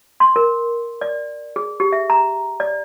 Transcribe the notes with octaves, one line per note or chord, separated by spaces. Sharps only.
C6
A#4
D5
G#4
G4
E5
A#5
D5